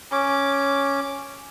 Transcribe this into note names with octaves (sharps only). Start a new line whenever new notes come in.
C#4 D6